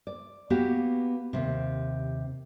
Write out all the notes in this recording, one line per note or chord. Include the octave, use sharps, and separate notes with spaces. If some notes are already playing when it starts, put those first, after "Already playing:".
D5
A#3 B3 F#4 G4
D#2 G#2 C3